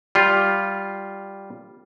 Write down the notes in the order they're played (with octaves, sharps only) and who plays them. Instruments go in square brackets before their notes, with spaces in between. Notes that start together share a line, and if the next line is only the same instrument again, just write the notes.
[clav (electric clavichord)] G3 F4